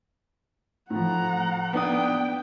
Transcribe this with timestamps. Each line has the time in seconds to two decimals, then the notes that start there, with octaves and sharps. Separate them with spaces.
0.90 A2 F3 F#5 A#5
1.73 B3 D4 G5 D#6